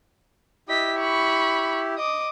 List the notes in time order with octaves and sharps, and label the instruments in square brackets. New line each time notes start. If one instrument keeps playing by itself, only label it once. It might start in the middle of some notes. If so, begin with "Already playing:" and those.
[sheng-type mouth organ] E4 G4 [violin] D#5 B6
[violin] B5 C#6
[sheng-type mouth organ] D#5 [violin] D6 D#6